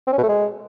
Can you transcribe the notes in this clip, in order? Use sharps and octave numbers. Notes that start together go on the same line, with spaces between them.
C4
C#4
B2
A3
G#3